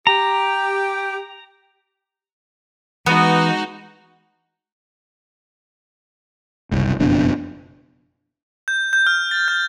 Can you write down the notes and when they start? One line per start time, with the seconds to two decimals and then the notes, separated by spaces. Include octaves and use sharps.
0.07 G4 A#5
3.06 E3 G#3 B3 D#4 F#4
6.71 F#1 C2
6.99 F#1 F2 B2 D4
8.68 G6
8.93 G6
9.07 F6
9.31 A6
9.48 G6